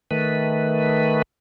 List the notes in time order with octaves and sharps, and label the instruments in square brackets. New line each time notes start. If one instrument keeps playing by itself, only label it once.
[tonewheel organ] D#3 A3 B4